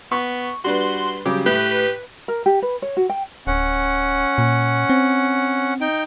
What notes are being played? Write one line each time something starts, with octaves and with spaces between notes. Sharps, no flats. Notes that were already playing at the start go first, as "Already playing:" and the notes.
B3 C#6
G3 D4 F#4 B4 C6
C#3 F#3 G3 G4
A2 G4 B4
A#4
G4
B4
C#5
F#4
G5
D1 C#4 F#5
A#2
C4
D#4 G5